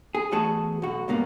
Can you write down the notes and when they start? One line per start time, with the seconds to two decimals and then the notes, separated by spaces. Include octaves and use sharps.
0.15 G#4
0.32 E2 A3 F#4 G#4 A5
0.82 B1 F#4
1.08 C#2 G2 A#3 B3